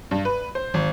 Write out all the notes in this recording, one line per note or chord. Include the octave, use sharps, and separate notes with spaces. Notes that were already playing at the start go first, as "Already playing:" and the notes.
G2
B4
C5
G#1